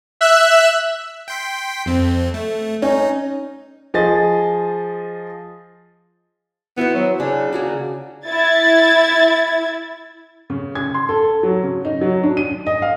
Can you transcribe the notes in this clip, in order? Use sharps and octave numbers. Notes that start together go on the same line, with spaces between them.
E5 E6 F#6
G5 C6 B6
F2 C4
A3
C#4 D#4
F3 G#4 D#5 A6
B3 E4 F#4 C5
F#3
C#3 D4
A#3 F#4 G#4
E4 G#6 A6
C#3
G#6
C6
A4
F#3
C#3
D#4
F#3
D4
D#7
D#5
F5